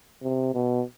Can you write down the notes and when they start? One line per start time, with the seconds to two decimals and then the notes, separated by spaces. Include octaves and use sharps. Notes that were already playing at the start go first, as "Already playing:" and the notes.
0.22 C3
0.54 B2